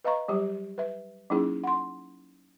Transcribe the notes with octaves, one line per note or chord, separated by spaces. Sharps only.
B4 D#5 F5 A#5 C#6
F#3 G3 G4 C#5
B4 E5
F#3 A#3 C#4 D#4 E4 G#4
F#5 C6